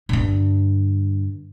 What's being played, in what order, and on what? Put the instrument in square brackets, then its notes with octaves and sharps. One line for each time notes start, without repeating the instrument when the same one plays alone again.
[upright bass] G2 D3